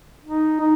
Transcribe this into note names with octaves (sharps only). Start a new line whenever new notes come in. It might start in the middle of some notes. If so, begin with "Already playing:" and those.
D#4
D#4